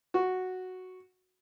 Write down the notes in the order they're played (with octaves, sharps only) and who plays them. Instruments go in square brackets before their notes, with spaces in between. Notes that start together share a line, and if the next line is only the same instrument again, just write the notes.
[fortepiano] F#4